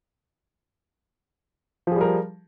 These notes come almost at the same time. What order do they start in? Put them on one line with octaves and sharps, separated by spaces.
F3 G#4 G3 A#4